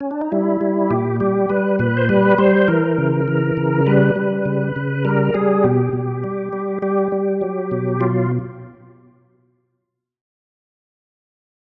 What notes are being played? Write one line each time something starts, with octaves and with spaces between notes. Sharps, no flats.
C#4
D4
D#4
G3 E4
G3
A#2 G4
G3 G4
G3 B4
A#2 B4
C5
G3 B4
G3 C5
E3 A#4
C#3
E3
C#3
G3 B4
G3
C#3
C#3
G3 A#4
G3 G#4
B2 G4
B2
G3
G3
G3 G4
G3
F#3
B2
F#3 F4